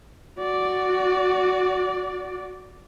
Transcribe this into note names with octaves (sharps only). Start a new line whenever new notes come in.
F#4 D5